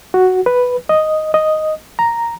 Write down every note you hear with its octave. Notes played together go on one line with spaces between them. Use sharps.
F#4
B4
D#5
D#5
A#5